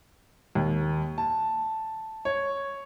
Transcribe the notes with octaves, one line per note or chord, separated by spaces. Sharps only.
D#2
A5
C#5